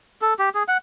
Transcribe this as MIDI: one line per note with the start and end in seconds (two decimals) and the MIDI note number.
0.22 0.34 69
0.39 0.49 67
0.55 0.63 68
0.68 0.77 78